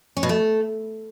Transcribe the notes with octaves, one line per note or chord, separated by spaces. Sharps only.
C#4
B2
A3